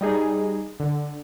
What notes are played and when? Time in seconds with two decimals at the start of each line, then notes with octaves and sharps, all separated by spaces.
0.01 G3 D#4 G#4
0.80 D3